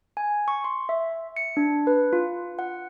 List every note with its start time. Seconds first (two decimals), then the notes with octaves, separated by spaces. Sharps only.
0.17 G#5
0.48 C#6
0.64 C6
0.89 E5
1.36 C#7
1.57 D4
1.87 B4
2.13 F4
2.59 F#5